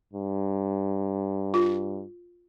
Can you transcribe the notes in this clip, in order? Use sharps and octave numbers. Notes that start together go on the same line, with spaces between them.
G2
F4